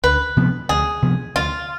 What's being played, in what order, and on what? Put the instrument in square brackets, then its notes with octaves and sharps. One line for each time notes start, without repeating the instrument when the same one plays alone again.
[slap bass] D2 [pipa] B4
[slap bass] C3 F3 B3
[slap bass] D2 [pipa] G#4
[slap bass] C3 F3 B3
[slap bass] D2 [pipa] F4